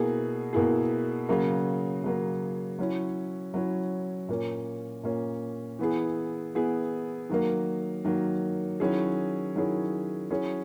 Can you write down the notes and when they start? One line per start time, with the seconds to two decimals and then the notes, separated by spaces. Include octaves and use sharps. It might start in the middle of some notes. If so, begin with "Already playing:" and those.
Already playing: B2 A#3 E4 G#4
0.53 B2 A#3 E4 G#4
1.29 C#3 F#3 A#3
2.04 C#3 F#3 A#3
2.79 F#3 C#4 E4
3.54 F#3 C#4 E4
4.29 A#2 A#3 C#4
5.03 A#2 A#3 C#4
5.79 E3 B3 E4 G#4
6.54 E3 B3 E4 G#4
7.29 D#3 F#3 A#3
8.05 D#3 F#3 A#3
8.80 D#3 F#3 C#4 E4 G#4
9.55 D#3 F#3 C#4 E4 G#4
10.30 F#3 C#4 E4 G#4